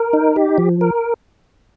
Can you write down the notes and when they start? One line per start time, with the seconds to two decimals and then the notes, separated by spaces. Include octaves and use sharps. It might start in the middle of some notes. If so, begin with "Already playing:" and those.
Already playing: A#4
0.13 D#4
0.36 G4
0.58 F3
0.81 A#4